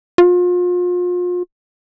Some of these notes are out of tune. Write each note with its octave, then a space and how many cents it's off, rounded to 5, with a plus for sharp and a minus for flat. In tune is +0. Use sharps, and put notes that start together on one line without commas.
F4 +35